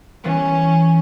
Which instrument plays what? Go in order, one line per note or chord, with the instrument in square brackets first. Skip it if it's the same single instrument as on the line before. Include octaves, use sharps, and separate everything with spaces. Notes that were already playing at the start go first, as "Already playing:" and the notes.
[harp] E3 G3 B3 [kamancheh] C#4